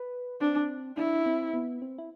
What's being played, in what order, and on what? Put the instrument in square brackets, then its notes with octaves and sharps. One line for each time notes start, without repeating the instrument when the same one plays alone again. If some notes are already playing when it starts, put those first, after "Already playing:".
Already playing: [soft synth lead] B4
[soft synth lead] C4 [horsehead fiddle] D4
[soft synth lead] D4 [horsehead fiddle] E4
[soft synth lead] C4
B3
C4
E4